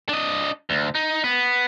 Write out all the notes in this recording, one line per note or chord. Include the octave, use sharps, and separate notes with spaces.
D4 D#5
D2
D#4
B3